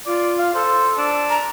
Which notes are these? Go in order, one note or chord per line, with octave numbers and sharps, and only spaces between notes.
F4 D5
F5
A4 C5
D4
A#5